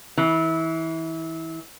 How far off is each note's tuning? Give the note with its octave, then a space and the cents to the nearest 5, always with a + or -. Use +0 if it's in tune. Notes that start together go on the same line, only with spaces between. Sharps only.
E3 -25